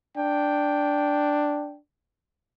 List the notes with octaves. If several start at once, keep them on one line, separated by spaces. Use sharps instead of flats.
D4 G5